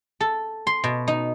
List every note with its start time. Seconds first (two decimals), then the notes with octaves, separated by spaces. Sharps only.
0.20 A4
0.67 C6
0.84 B2
1.08 D#4